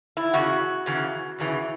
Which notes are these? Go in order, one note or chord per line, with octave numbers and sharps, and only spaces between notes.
E4
E2 C#3 F#4
E2 C#3 E3
E2 C#3 E3